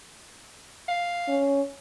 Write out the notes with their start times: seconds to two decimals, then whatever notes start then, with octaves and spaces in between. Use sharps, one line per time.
0.88 F5
1.28 C#4